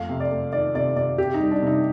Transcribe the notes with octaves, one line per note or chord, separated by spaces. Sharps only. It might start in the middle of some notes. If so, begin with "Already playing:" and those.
Already playing: F2 A3 F5
C3
D5
A3
D#3 D5
C3 D5
C3 D5
C3 G4
D#4
G3
D4
C3
D#4